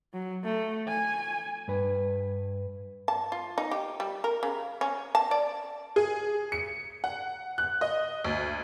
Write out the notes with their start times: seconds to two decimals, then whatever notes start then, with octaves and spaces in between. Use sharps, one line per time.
0.14 F#3
0.45 A3
0.88 G#5
1.68 G2 B4
3.08 A5
3.32 F4
3.58 D#4
3.71 G4
4.00 G3
4.24 A#4
4.43 C#3
4.81 C#4
5.15 A5
5.31 D5
5.96 G#4
6.52 C#7
7.04 F#5
7.58 F#6
7.81 D#5
8.25 D2